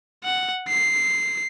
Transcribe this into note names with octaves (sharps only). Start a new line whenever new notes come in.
F#5
C7